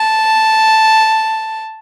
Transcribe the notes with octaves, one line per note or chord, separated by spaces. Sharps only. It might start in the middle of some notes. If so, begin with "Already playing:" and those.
Already playing: A5